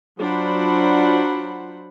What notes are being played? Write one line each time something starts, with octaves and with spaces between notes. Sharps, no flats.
F#3 D4 F4 C5 F#5 B5